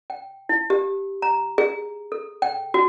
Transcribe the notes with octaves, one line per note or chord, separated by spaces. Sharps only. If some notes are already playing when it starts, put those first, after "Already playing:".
G5
E4
G4
A#5
G#4
A4
G5
F#4